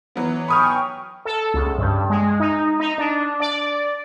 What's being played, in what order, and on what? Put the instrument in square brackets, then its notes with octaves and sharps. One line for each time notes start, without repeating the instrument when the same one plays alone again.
[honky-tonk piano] E3 F#3 B3
[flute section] G5 G#5 C#6 [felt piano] B5 D#6 F6
[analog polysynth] A4
C#2
G2
G#3
D#4
D#4
D4
D5